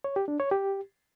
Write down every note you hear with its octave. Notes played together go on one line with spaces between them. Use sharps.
C#5
G4
D4
C#5
G4